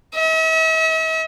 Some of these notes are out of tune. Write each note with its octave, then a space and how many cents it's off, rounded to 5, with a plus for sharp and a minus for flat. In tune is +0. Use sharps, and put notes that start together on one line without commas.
E5 -45